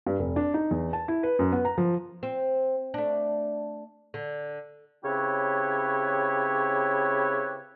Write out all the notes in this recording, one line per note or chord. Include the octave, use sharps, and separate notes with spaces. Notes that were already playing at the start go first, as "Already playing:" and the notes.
G2
F1
D4
D#4
E2
A5
E4
B4
F#2
B3
A#5
F3
C4
A3 D4
D3
C#3 C4 E4 G4 B4 C#5